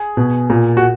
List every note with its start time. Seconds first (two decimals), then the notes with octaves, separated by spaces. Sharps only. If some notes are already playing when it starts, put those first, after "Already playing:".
Already playing: G#4
0.17 B2
0.50 A#2
0.77 F#4